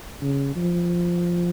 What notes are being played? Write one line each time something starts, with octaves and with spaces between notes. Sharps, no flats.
C#3
F3